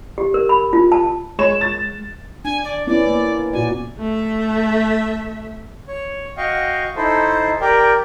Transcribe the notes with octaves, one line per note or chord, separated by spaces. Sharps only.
G4
A#4
B5
F4
A5
G#3 C#5 E7
A6
D4 G#5
D5
B3 C#4 E4 D5
A#3
A#2 F#4 D5 G#5
A3 E5
C#5
F#4 D#5 F5 G5 C#6
D#4 E4 A4 C5
G4 A#4 D5 G5